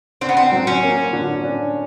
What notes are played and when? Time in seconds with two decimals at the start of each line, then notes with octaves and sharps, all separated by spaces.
0.21 C4 D4
0.29 B3
0.37 C4
0.52 F#3
0.67 C#4
0.82 A#3
1.13 D3
1.43 D4